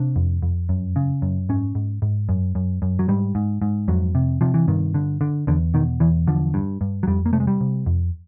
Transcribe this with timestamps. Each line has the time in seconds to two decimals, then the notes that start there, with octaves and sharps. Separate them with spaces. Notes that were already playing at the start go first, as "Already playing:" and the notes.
Already playing: C3 D4
0.16 F2
0.43 F2
0.69 F#2
0.96 C#3
1.22 F#2
1.49 G#2 C#4
1.75 G#2
2.02 G#2
2.29 F#2
2.55 F#2
2.82 F#2
2.99 F#3
3.08 G#2 G3
3.35 G#2
3.62 G#2
3.88 F2 F#3
4.15 C3
4.41 C3 F3
4.54 E3
4.68 G2 D#3
4.94 D3
5.21 D3
5.47 E2 D3
5.74 B2 D#3
6.00 E2 E3
6.27 D3 F3
6.54 G2
6.81 G2
7.03 F#3
7.07 F2 G3
7.26 A#3
7.33 C3 A3
7.40 G#3
7.47 G3
7.61 C3
7.86 F2